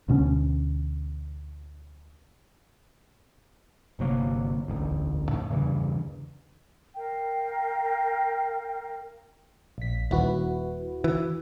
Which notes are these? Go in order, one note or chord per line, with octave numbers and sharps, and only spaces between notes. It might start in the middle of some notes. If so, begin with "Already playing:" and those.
D2 B2 A3 C#4
G1 C3 F#3 A#3
E1 A1 D2
F2 A2
E2 G2 C#3 E3
A#4 F5 G5
A#1 B6
D#1 E4 F#4 B4
E3